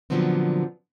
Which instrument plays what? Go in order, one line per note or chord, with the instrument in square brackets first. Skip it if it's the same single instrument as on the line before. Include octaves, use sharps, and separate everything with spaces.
[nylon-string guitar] A#2 D3 F3 F#3 B3 C4